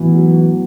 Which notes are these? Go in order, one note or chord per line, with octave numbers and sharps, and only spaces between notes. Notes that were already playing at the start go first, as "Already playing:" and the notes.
Already playing: A2 E3 F#3 B3
F#3
F#4